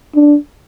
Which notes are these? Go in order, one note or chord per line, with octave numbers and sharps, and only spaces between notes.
D4